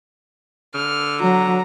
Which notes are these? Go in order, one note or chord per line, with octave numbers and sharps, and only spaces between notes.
D3 F6
F#3 A#5